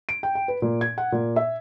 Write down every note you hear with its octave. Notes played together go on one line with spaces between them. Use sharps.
D7
G5
G5
B4
A#2
G#6
F#5
A#2
E5